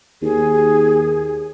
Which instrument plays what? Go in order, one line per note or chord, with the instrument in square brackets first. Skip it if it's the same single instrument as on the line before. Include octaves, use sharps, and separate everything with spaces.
[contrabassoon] D#2 [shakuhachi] G#4